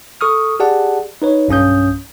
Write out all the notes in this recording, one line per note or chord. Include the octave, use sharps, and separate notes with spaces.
A4 C#6 D#6 F6
G4 G#4 D5 F#5 A5
D#4 B4 C#5
B1 G2 C#4 D#6 G6